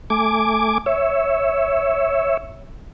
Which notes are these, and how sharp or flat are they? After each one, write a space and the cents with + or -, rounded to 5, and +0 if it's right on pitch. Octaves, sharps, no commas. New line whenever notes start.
A3 +0 G#5 +0 D6 +0
C#5 +0 E5 +0